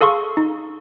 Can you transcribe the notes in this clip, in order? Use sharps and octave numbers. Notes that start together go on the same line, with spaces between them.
G#4 A4 F5 C6 C#6
D#4